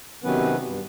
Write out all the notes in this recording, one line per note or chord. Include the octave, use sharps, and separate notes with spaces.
C3 D#3 F#3 B3 C#4 B4
G2